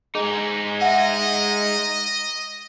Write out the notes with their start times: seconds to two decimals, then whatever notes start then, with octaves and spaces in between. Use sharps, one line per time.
0.15 G#3 D#4 G#4
0.82 D#5 E5 F#5